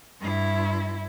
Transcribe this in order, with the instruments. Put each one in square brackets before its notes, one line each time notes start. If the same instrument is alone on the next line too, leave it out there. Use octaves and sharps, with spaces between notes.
[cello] G2 E4